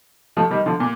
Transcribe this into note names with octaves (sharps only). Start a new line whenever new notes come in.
F3 A3
D#3 G3
D3 F3
A#2